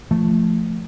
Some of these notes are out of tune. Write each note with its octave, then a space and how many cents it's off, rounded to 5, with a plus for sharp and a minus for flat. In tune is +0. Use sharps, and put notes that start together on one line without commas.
F3 -15 A3 +0